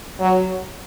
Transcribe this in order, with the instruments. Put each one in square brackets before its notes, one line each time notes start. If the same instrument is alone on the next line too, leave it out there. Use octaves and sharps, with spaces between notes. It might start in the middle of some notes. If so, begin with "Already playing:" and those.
[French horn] F#3